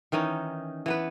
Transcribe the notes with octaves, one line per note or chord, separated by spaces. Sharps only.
D#3 E3 C#4 D#4
E3 B3 B4